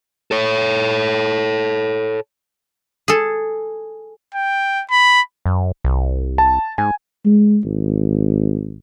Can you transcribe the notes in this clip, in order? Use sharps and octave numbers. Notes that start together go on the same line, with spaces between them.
A4 C#5
G#4 A4
G5
B5
F#2
C2
A5
G#2 G#5
G#3
G#1